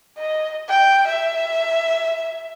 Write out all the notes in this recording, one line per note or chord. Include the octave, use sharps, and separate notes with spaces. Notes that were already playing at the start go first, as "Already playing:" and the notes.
D#5
G5
E5